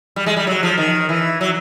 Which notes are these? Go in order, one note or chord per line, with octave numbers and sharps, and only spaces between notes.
G3
G#3
G3
F#3
F3
D#3
E3
F#3